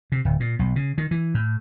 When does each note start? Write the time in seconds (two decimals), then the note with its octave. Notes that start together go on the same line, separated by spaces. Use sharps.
0.12 C3
0.25 D1
0.40 A#2
0.59 B1
0.76 C#3
0.98 D#3
1.11 E3
1.34 A2